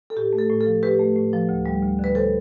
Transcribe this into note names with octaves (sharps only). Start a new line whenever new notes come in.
A4
A2 G4
A3
A4
A2
A4
F3
A2 G4 B4
A3
A2
F3
D2
G3
D2
D3 B4
A4 C5